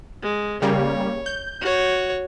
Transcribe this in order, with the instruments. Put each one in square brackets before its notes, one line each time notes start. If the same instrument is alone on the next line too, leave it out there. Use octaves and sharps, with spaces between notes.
[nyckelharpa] G#3
[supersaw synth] C#3 G3 A#3 [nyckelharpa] C#5
[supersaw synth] G6
[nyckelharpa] F#4 C#5